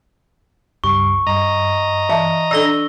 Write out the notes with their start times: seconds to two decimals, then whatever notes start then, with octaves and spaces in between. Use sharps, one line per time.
0.84 C#2 G2 G3 C#6
1.27 G2 D#5 A#5
2.09 E3 E5 A5
2.51 D4 A4 D5 E6 A#6 G7